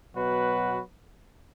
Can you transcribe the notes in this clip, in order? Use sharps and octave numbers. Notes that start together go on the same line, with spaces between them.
B2 F#3 B3 F#4 B4